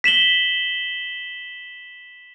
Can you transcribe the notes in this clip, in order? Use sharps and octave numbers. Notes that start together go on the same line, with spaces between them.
B6 E7 F#7 G7